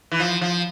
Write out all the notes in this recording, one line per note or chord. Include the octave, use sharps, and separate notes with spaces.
E3
F3
F3